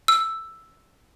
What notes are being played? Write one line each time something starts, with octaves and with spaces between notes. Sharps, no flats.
E6